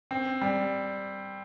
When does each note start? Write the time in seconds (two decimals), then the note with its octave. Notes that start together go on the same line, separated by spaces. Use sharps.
0.11 C4
0.42 G3